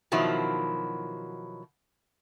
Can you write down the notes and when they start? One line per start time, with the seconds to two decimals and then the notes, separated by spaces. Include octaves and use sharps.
0.12 B2 D#3 F3 F#3 E4